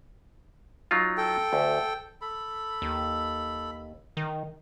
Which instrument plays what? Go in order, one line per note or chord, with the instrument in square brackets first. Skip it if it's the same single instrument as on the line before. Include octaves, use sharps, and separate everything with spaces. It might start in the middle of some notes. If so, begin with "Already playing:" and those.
[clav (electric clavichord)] F#3 D#4 F4
[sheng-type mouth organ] A4 G5
[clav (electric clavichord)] D2
[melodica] A4 B5
[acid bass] D#2
D#3